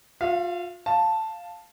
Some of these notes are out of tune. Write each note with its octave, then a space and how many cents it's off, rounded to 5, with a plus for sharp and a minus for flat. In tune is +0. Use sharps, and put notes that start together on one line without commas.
F4 +30 F5 -35
F5 +0 A5 +0